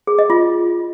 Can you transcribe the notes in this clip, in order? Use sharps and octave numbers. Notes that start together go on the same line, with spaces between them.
G#4
D#5
F4